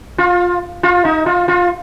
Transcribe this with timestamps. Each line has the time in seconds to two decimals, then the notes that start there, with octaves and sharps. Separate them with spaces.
0.18 F4
0.83 F4
1.05 D#4
1.26 F4
1.48 F4